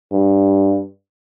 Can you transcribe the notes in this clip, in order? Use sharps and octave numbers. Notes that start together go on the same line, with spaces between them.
G2